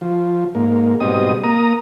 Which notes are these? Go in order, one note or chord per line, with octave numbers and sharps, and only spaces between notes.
F3
G#2 A#3
G#2 B2 G3 C4 D#5 D#6
A#3 A#5 D#6